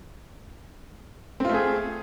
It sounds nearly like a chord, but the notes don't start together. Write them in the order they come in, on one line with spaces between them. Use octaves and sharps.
C4 F4 A3 G#4